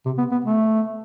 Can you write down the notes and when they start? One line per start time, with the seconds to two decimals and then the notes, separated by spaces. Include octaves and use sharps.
0.06 C3
0.18 B3
0.32 B3
0.45 A3